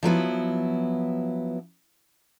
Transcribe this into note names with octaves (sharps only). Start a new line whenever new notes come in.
F3 F#3 B3 E4